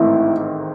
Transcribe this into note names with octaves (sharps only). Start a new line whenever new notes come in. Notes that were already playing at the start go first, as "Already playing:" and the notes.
Already playing: A1 G#2 D#3 A3 C4 E4